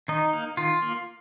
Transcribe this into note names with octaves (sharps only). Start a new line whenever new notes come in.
D#3 D#4
A#3
D#3 F4
A#3